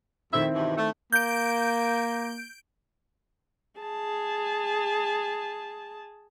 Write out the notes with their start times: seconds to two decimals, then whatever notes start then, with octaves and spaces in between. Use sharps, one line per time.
0.33 F2 D#3 A3 C4 E4 E5
0.54 G2 B2 E3
0.77 A3
1.12 A#3 G6 D7
3.80 G#4 A5